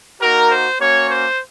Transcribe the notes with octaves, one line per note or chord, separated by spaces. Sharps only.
A#3 D#4 F#4 A#4
C5
A#3 C#4 F#4 C#5
C5